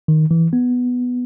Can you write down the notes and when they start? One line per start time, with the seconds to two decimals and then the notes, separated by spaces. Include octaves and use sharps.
0.08 D#3
0.31 E3
0.53 B3